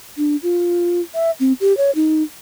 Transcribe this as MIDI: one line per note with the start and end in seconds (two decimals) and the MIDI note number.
0.17 0.36 62
0.43 1.01 65
1.14 1.31 76
1.40 1.53 60
1.61 1.76 67
1.77 1.91 73
1.95 2.22 63